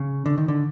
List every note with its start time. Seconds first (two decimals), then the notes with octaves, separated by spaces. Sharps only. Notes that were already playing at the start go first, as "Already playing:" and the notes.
Already playing: C#3
0.26 D3
0.38 D#3
0.48 D3